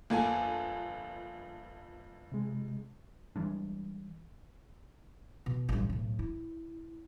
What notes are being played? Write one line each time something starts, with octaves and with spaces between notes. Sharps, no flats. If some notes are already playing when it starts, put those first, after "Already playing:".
G1 F2 A#3 A4 G#5
C3 G#3
E3 G3 G#3 D4
B2
A1 G2
B1 A2
E4